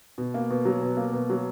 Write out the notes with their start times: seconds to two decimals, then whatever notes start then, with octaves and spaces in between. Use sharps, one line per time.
0.18 B2
0.34 A#3
0.50 B2
0.65 F#3
0.82 B2
0.97 A#3
1.13 B2
1.30 F#3